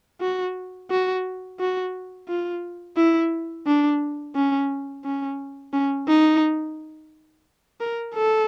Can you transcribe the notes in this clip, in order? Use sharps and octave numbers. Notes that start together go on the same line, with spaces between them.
F#4
F#4
F#4
F4
E4
D4
C#4
C#4
C#4
D#4
A#4
A4